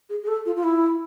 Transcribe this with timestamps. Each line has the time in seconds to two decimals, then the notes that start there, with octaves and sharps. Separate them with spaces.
0.10 G#4
0.23 G#4
0.28 A4
0.46 F4
0.56 F4
0.64 E4